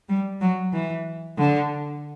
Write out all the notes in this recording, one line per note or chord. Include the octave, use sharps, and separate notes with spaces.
G3
F#3
E3
D3